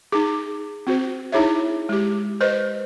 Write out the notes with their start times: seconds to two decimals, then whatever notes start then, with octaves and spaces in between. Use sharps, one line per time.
0.12 D#4 G#4
0.87 C4 F#4 C5
1.32 D#4 E4 G#4 C#5 E5
1.89 G#3 G4
2.41 B4 C5 D#5